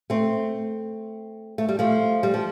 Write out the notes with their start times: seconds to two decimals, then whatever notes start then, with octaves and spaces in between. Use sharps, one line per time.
0.10 A3 C4
1.58 A3
1.69 G3
1.79 F3 A3
2.23 G3
2.34 F3